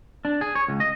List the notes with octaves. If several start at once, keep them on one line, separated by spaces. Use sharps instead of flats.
D4
G#4
C#5
C#2
D#5